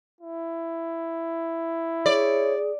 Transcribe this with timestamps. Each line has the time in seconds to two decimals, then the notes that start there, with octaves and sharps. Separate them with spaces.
0.21 E4
2.06 G#4 C#5 D5